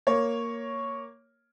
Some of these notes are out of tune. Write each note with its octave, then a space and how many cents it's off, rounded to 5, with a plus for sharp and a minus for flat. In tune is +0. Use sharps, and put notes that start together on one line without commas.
A#3 +0 C#5 +0